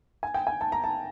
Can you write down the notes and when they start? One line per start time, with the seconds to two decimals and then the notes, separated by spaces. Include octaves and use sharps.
0.23 G#5
0.34 G5
0.47 G#5
0.61 A5
0.72 A#5
0.84 A5